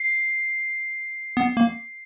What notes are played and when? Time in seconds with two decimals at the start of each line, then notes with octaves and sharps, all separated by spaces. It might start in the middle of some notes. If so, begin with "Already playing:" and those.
Already playing: C7
1.37 B3
1.57 A#3